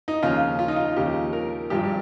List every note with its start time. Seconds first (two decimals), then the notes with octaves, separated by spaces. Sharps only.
0.08 D#4
0.23 D#2 C#3 F3 F4
0.59 F4
0.68 D#4
0.76 F4
0.96 D#2 C#3 F3 G4
1.33 A#4
1.70 G#1 G2 F3 G4